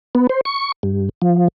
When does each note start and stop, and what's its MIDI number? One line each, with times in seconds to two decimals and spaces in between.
0.15 0.27 59
0.29 0.41 72
0.45 0.72 85
0.83 1.09 43
1.22 1.48 53